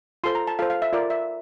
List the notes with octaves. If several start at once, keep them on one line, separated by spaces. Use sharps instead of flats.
F4 A4 C5 C6
A#5
A5
F4 A4 C5 F5
F5
E5
F4 A#4 D5
E5